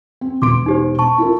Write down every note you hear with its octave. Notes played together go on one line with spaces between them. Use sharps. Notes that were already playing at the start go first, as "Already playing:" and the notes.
C4
E1 B3 C6 D6 D7
D#4 G4 C5
A5 C#6
E4 F4 A#4